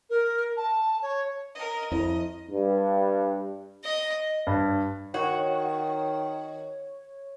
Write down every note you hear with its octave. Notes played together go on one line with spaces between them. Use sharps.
A#4
A5
C#5
A#4 D#5
F2 E4 D#5
G2
D#5
G2
D#3 F#4 C#5